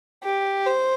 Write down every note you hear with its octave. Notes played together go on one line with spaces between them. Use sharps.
G4
C5